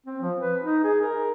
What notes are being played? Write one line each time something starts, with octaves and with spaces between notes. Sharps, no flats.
C4
F3
B4
D#4
G#4
A#4